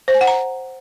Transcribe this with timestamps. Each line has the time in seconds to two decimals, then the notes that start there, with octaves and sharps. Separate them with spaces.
0.08 C5
0.14 G#5
0.21 F#5
0.27 A#5